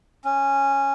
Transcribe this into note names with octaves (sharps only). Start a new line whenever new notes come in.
C#4